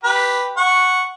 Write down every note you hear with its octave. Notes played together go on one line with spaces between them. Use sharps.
G4 B4
F#5 C#6